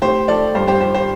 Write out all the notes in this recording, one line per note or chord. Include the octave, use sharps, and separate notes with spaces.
A2 G4 C5
F3 A4 D5
G2 G4 C5
G4 C5
F3 G4 C5
G4 C5